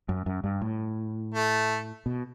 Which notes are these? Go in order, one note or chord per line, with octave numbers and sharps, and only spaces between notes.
F#2
F#2
G2
A2
A3
B2